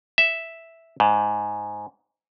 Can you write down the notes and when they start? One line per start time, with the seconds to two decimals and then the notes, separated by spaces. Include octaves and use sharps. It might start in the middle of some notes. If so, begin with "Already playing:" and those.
0.18 E5
1.00 G#2